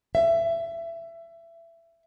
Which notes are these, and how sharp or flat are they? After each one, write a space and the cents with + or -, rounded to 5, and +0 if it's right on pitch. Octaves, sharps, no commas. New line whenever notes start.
E5 +25